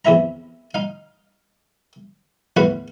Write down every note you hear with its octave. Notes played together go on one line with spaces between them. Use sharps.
E2 C3 E4 E5 A#5
D#4 F5
E2 A2 F#4 B4 F5 F#5